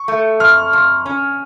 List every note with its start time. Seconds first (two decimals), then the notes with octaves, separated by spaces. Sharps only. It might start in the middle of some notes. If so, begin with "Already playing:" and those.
Already playing: C#6
0.08 A3
0.40 F2 F6
0.73 F2
1.06 C#4